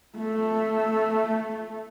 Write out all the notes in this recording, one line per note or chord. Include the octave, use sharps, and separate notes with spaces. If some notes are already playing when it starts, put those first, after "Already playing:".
A3